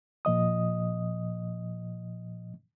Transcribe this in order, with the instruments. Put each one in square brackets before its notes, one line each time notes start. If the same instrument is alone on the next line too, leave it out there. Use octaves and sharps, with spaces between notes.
[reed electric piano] A#2 F3 D#5 D#6